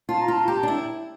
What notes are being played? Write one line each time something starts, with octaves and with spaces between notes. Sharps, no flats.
F4 A5
A#5
F4 A5
G4 A#5
A5
D4
E4